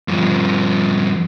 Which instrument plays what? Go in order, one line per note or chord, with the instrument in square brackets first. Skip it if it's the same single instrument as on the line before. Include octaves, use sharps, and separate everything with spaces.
[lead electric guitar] G2 F3